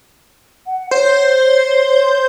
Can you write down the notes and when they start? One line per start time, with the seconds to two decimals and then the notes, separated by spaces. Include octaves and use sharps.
0.66 F#5
0.91 C5 C#5